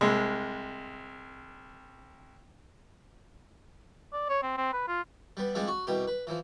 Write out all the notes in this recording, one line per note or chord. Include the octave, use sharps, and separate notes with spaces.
C2 G#3
D5
C#5
C4
C4
B4
F4
G3 B3
F3 G3 G#3 C4 D4
F#4
C2 B2 G4
B4
E3 F3